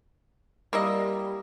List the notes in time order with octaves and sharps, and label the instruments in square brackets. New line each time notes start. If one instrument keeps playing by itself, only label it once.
[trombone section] G3 [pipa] A#3 E4 D#5